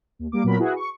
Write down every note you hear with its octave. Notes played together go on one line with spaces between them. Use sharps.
D#2
G3 A#3 D6
A#2 F#3 B3 A#4 B5
E4 F#4 G#4 B4
C#6